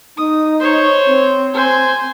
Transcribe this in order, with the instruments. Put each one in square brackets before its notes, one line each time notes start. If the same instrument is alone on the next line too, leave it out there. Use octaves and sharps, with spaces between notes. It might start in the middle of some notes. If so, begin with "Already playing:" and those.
[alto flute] D#4 [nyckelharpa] D#6
[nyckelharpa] C5 C#5
[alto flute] C4
[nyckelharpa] C5 G#5